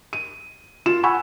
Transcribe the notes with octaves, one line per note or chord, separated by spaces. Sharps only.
D#7
F4 F5 E7
F#5 G#5 B5 C#6 E6